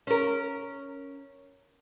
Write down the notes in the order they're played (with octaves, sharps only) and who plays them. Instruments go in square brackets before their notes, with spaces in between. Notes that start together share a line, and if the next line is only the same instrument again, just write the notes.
[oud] C#4 A#4